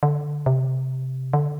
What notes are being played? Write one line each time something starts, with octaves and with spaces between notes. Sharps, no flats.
D3
C3
D3